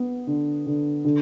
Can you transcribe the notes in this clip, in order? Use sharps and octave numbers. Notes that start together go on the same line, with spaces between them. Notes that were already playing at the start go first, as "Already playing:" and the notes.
Already playing: B3
D3
D3
D3